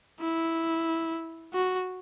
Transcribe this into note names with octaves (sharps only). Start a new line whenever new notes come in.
E4
F#4